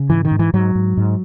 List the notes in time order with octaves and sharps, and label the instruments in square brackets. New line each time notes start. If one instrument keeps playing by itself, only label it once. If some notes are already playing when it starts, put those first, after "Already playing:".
Already playing: [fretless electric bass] C#3
G#2 E3
D#3
G#2
E3
G#2 F#3
G#2
G#2